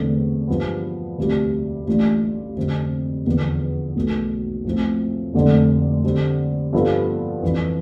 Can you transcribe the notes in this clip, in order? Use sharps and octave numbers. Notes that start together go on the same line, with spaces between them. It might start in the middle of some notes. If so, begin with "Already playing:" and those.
Already playing: E2 D3 A3 C4
G2 F3 B3
D2 C3 G3
A1 A2 G3 D4 F4
F2 D3 G3 C4
E2 D3 F3 B3
B1 B2 A3
A2 F3 C4
F1 F2 D3 A3 D4
D3 G3 C4
G2 F3 B3 F4 A4
F2 E3 G3